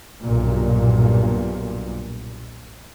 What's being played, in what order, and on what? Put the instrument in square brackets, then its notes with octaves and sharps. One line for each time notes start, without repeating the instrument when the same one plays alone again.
[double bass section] B1 G2 A#2